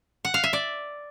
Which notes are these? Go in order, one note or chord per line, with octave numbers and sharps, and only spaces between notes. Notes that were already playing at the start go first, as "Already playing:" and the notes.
F#5
F5
E5
D5